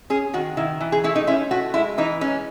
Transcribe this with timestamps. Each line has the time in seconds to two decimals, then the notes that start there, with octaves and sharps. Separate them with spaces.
0.10 C#4 G#4
0.34 D#3 F#4
0.57 D#3 E4
0.80 E3
0.92 G#4
1.04 A3 E4
1.16 D#4
1.27 C#4 E4
1.51 A3 F#4
1.74 G#3 E4
1.98 E3 D#4
2.21 G#3 C#4